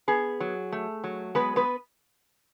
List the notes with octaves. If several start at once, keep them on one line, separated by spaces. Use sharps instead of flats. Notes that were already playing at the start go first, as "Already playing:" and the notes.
B3 G#4
F#3
A3
F#3
G#3 B3 B4
B3 B4